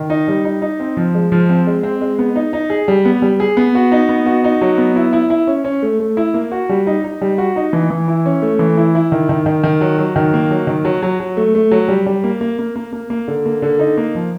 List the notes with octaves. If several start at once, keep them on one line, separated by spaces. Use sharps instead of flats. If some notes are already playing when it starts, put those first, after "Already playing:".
Already playing: D#3
D#4
G3
D#4
D#4
C4
F3
G#3
F3
C4
G#3
C4
G#3
B3
D#4
D#4
G#4
G3
B3
G3
G#4
B3
F#4
D#4
B3
F#4
D#4
F#3
B3
E4
E4
E4
C#4
C#4
A3
A3
E4
A#3
F#4
G3
D#4
D#4
G3
F#4
D#4
E3
E3
E4
C#4
A3
E3
E4
E4
D#3
D#3
D#3
D#3
F#3
F#3
D#3
A#3
F#3
D#3
F#3
F#3
F#3
A3
A3
F#3
G3
G3
A#3
A#3
A#3
A#3
A#3
A#3
D3
A#3
D3
D#4
A#3
F3